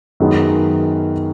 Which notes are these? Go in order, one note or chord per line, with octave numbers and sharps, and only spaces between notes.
F#2 D#3 G#3 B3